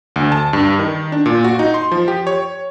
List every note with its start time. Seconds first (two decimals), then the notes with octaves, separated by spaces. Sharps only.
0.16 D2
0.32 A5
0.53 G2
0.79 D#3
1.12 D4
1.26 A#2
1.44 F#4
1.59 D#4
1.74 C6
1.91 F3
2.08 G4
2.27 C#5